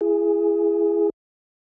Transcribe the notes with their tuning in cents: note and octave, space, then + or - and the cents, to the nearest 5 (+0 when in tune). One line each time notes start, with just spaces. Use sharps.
E4 +30 G#4 +0